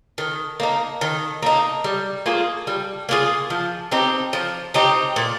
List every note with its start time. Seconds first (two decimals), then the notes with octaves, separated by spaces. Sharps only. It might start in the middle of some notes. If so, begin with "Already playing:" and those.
0.18 D#3
0.60 A#3 D#4
1.01 D#3
1.43 A#3 D#4
1.84 G3
2.26 A#3 F4 G#4
2.67 G3
3.09 A#3 F4 G#4
3.50 F3
3.92 C4 D#4 G4
4.33 F3
4.74 C4 D#4 G4
5.16 A#2